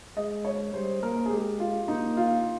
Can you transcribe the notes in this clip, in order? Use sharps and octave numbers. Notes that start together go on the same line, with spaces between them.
G#3 D#5
C#5
G3 C5
A#3 A#4
G#4
G#3 G4
F4
A#3 D#4
F4